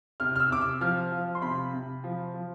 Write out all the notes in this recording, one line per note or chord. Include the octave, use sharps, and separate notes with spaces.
C3 F6
F6
E6
C3 D6
E6
F3 F6
F3
C6
C3 B5
C3
F3
F3